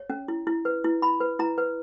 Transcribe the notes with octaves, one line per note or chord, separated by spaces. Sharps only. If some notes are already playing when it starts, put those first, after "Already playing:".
Already playing: C#5
C#4
E4
E4
B4
E4
E4 B5
B4
E4 A#5
B4